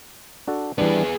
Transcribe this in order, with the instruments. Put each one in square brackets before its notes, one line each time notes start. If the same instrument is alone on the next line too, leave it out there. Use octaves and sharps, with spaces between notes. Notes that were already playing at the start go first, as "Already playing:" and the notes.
[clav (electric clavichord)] D4 F#4 A4
[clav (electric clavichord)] E3 G3 D4 [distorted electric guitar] B3 G#4